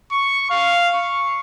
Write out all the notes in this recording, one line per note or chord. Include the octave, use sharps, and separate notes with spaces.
C#6
F5
C#6